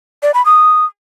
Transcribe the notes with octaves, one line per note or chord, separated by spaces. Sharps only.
D5
B5
D#6